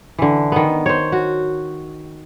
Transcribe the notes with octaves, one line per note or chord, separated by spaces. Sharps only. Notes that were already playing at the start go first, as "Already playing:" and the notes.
D3 E3
D#3 B3
C5 C#5
F#4